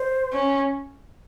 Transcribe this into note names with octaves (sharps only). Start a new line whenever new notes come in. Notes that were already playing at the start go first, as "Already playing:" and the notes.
Already playing: C5
C#4